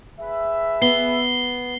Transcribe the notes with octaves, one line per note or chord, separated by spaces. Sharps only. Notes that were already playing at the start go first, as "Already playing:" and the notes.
G#4 B4 E5
B3 C7 G7